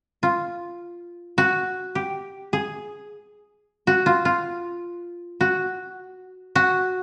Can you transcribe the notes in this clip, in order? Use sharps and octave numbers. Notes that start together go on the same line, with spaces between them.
F4
F#4
G4
G#4
F#4
F4
F4
F#4
F#4